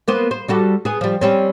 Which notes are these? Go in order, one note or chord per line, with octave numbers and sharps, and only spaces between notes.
A#3 B3 C5
C5
G3 F#4 A4
B3 G#4
F3 G3
G3 C4 C#4